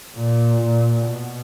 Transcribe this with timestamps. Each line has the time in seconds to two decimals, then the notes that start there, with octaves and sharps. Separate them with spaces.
0.16 A#2
0.61 A#2
1.07 B2